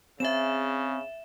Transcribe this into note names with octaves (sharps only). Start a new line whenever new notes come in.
C#3 C4 G#4 E5 E7